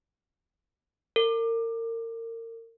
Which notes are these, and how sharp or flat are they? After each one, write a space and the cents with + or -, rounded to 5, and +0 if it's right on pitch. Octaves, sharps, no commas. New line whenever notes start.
A#4 -35